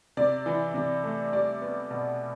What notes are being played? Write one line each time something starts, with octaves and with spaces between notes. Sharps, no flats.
C3 D5
E3
C3
A3
G3 D5
B3
B2